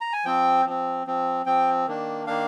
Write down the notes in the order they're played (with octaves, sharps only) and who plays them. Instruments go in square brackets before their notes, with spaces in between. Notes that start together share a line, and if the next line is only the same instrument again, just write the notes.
[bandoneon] A#5
G#5
F3 C4 G5
F3 C4
F3 C4
F3 C4 G5
D#3 A#3 D4
D#3 A#3 D4 F5